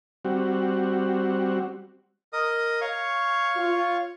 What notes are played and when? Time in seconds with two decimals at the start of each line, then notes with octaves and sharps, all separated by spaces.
0.25 G3 C4 F#4
2.33 A#4 D#5 D#6
2.81 C#5 F5 C#6
3.56 F4